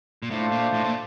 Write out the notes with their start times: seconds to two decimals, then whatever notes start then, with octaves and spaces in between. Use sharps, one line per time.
0.22 A#2
0.30 A2 A3 D4 F4 C5 F5
0.52 A#2
0.74 A2
0.84 A#2